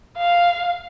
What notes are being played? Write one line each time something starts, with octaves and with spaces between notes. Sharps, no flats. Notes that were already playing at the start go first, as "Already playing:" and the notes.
F5